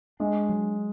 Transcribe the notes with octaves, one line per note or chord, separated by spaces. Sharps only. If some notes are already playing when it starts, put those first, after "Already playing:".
G#3 D4
F#3